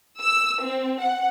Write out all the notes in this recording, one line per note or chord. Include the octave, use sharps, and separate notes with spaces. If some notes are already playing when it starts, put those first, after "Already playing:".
E6
C4
F#5